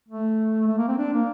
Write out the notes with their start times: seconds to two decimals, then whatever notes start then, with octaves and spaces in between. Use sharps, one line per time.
0.08 A3
0.68 A3
0.78 A#3
0.88 C4
0.98 D4
1.13 A#3